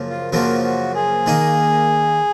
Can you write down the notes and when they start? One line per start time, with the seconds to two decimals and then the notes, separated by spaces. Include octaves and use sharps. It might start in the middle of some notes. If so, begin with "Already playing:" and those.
Already playing: F#2 C#3 F3 A#3
0.09 F4
0.32 F#2 C#3 F3 A#3 F#4
0.64 F#4
0.95 G#4
1.26 D#3 A#3 D#4